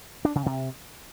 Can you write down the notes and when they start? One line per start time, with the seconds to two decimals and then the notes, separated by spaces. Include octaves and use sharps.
0.25 D4
0.35 C#3
0.46 C3